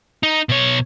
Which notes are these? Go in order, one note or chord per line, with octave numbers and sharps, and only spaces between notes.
D#4
B2 C#5